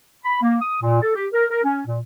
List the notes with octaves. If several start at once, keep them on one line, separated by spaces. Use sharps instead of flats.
B5
A#3
D#6
A#2
A4
G4
A#4
A#4
C#4
A#2